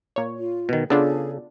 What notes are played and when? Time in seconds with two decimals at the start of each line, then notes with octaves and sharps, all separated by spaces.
0.16 A#2 C#5
0.38 F4
0.69 B2 D#3
0.90 C#3 B3 D4 F4 G#4 A4